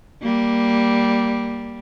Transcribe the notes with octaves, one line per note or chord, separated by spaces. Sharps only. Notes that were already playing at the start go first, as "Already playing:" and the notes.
G3 A#3